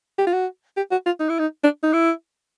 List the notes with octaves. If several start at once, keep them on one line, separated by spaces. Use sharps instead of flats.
G4
F4
F#4
G4
F#4
F4
D#4
E4
D#4
D4
D#4
E4